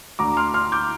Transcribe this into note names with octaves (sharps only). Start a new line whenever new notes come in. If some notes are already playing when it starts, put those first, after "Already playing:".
D2 D3 A#5 D6
C6 F6
C6 F6
D6 G6